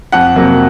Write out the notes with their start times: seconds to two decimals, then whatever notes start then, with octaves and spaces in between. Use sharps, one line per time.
0.12 F2 F#5
0.36 C3 F#3 A#3